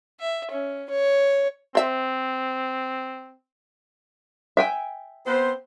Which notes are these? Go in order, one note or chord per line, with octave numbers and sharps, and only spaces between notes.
E5
C#4
C#5
C4 C5 E5
E5 G5 G#5
B3 C4 C5